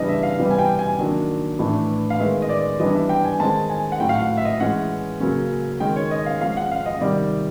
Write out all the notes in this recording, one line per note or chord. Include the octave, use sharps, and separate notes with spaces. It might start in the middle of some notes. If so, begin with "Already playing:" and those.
Already playing: C#3 E3 G3 B3 D4 D#5
E5
F5
C3 E3 G3 B3
G#5
G5
G#5
D#3 F#3 A#3 D4
A2 E3 A3 D4
F5
D#3 G#3 B3 E5
D#5
D5
E3 G3 B3 D4 D#5
E5
G5
G#5
D#3 G#3 C4 D#4 A5
G#5
F#5
A2 F#3 A3 G5
F5
F#5
E5
D#5
E3 G#3 C#4 F#5
C#3 F#3 A#3 C#4
D#3 G#3 C#4 G5
C#5
D#5
F5
F3 G#3 C#4 F5
F#5
F5
D#5
C3 D#3 G3 D5